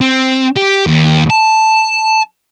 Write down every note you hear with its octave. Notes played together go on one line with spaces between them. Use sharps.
C4
G4
D#2
A5